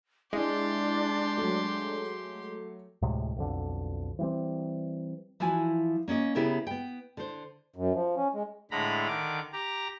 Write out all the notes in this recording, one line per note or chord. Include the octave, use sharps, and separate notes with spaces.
G#3 D4 E4 G4 D5 C6
F#3 A3
D2 A2 C3 G#3
B1 F2 D3
E3 G3 C4
E3 F3 E4 F#4 G#5
A#3 C#4 D#4 D#5
C#3 B3 E4 G4 G#4 A#4
B3 G5
D3 C5
F#2
F3
C#4
G#3
A2 D3 G#3 A#5 B5
D3 D#3 D6
G4 A#5